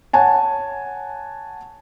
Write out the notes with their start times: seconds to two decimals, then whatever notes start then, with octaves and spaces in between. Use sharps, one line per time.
0.13 C#5 F#5 G#5 A5